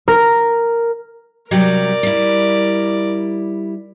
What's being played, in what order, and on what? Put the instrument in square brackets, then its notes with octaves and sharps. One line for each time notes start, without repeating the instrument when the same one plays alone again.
[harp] A#4
[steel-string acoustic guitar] C3 F#3 G3 [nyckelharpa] A#4 D5
[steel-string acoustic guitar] G3 E4